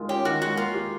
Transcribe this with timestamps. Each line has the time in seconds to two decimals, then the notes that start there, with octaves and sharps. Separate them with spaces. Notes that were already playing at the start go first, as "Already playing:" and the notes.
Already playing: D#3 G#3 F4
0.09 C#4 G4
0.25 D#3 F#4
0.42 G#3 F#4
0.57 A#3 F4
0.74 G4